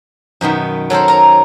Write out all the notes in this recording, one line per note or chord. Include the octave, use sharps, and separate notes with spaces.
F#2 B2 D#3 B3
F#3 A4 A#4 C5
A#4 A#5